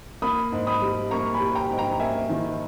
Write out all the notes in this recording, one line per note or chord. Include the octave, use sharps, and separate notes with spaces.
A#3 B5 D#6
G#2
B5 D#6
G3
A#3 A#5 C#6
G#5 B5
G3
G5 A#5
G#2
G5 A#5
A#3 E5 G#5
D#3